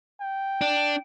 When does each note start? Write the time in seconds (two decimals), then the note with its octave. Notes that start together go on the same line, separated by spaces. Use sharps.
0.21 G5
0.61 D4